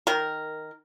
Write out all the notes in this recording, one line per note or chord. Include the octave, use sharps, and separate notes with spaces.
D#3 A#4